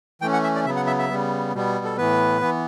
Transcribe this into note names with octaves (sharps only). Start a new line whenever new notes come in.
E3 A3 C#4 G5
F#5
E5
D5
C#3 F#3 B3 E5
F#5
E5
E5
C#3 G3 B3
B2 G3 B3
A4
A2 E3 B3 B4
E3 B3